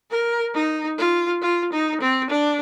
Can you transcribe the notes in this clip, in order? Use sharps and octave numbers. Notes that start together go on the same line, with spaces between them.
A#4
D#4
F4
F4
D#4
C4
D4